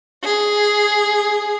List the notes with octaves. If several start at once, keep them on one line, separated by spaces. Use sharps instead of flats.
G#4